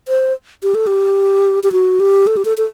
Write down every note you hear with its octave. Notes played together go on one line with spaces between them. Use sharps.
C5
G4
A4
G4
G4
F#4
G4
A4
G4
A4
A4